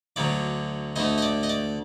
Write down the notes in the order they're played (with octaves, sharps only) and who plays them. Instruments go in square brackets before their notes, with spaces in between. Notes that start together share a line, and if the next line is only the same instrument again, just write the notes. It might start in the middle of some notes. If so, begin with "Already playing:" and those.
[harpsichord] D2 D3 F#3 D5
D2 D3 A3 D#5
D#5
D5
D#5
D5